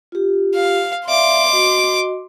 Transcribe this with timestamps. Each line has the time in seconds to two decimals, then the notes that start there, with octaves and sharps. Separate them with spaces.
0.12 F4 G4
0.55 F5
1.08 D5 E5 F5 C6 D6
1.49 F#4 D#5